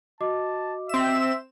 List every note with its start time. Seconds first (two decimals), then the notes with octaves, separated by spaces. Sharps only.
0.21 F#4 D#5 A5 D6
0.89 C4 E5 E7